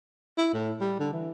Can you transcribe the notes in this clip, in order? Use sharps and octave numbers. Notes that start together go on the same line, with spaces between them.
E4
A2
G3
D3
E3